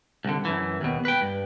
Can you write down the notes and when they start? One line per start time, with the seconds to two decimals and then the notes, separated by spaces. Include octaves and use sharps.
0.25 C2 D3
0.45 F#2 E3
0.81 D#2 B2
1.05 B4 G5
1.21 G2